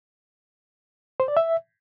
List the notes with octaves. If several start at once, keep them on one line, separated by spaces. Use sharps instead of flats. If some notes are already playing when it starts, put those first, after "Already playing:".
C5
D5
E5